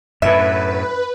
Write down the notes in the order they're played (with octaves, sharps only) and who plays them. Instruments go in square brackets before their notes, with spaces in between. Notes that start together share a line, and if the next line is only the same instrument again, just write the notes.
[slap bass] F#2 A2 [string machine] B4 [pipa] E5